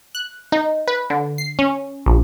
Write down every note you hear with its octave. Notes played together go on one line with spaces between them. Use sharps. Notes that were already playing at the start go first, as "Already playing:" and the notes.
F#6
D#4
B4
D3
C7
C#4
A#1